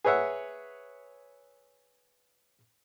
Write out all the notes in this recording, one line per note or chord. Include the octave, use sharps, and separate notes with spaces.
G#4 B4 C#5 E5 F#5